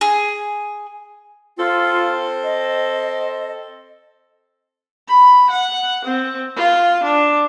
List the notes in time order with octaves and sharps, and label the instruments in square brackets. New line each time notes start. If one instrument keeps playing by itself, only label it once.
[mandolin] G#4
[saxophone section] C4 A4 C5 [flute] F4
[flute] D#5
[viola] B5
F#5
C4
F4
D4